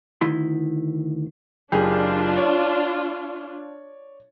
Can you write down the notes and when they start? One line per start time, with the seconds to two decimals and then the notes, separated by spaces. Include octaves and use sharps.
0.21 D2 D#3 E4 C6
1.72 F#1 D4 F4 G4 G#4
2.36 C#5 D5